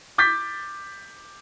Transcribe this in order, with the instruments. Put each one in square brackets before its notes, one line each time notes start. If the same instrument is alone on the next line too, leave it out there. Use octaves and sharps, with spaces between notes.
[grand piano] D6 G6 A6 B6